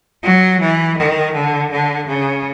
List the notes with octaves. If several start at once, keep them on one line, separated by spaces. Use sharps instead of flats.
F#3
E3
D#3
D3
D3
C#3